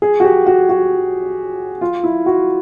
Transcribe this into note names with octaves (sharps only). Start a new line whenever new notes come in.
G#4
F#4
G4
F#4
F#4
F4
E4
F#4